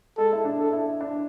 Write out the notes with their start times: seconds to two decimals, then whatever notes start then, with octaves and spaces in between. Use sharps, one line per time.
0.17 G#3 A4
0.33 E4
0.45 D4
0.58 A4
0.73 E4
1.01 D4